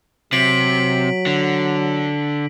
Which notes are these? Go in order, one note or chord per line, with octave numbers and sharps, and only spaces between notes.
C3 F#3 B6 D7 F#7
D3